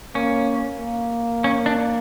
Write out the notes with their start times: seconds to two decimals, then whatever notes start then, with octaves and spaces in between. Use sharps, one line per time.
0.15 A#3 C#4
0.80 A#3
1.44 C#4
1.66 D4